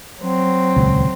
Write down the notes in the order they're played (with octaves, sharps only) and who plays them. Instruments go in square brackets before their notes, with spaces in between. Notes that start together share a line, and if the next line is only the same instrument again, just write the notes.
[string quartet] F#3 C4
[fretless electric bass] D#1 C#2